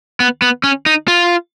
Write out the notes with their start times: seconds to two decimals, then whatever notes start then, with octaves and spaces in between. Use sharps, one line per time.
0.20 B3
0.42 B3
0.64 C#4
0.86 D#4
1.08 F4